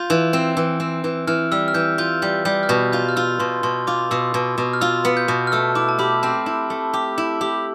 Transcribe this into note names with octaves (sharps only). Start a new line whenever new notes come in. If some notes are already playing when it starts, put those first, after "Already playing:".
Already playing: F4 G6
E3
C4
E3
C4
E3
E3 F6
G3 E6
F6
E3 G6
F4 G6
G3 G6
G3 G6
F6
B2 G6
F4 G6
F6
F4 E6
B2 C6
B2 C6
F4 D6
B2 E6
B2
B2
F6
F4 E6
B3
G6
B2
F6
A3 E6
E4 D6
A5
G4 B5
C4 A5
E4
A3
G4
E4
G4